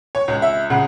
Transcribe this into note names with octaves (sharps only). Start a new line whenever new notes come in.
C#5
C#2
E5
C#3 F#5